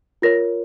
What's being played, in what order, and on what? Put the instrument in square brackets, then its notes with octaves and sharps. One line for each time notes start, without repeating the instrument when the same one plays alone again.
[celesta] F4 A#4 C#5 A#6